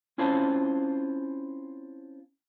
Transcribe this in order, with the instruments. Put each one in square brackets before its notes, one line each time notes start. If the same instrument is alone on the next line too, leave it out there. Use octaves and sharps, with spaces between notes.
[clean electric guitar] C4 C#4 E4 F4 C5 A5